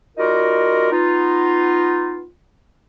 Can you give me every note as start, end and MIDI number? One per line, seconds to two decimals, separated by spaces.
0.17 0.88 55
0.17 0.88 63
0.17 0.88 65
0.17 0.88 66
0.17 0.88 70
0.91 2.25 59
0.91 2.25 63
0.91 2.25 65